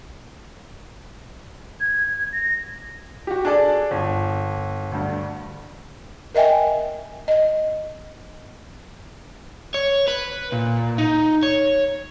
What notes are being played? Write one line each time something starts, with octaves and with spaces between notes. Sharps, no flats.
G#6
A#6
F#4 G4
D4 G#4 A4 D5
G1
D2 G2
A#4 D#5 E5 G5 G#5
D#5
C#5
B4
A#2
D#4
C#5